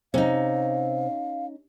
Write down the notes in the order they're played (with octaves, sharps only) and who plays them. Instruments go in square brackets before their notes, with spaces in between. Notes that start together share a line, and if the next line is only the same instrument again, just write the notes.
[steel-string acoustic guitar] C3 [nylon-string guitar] C#4 D#4 [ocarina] F5